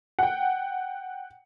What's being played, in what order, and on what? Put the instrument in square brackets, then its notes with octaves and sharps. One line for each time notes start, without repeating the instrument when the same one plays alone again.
[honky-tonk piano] F#5 G5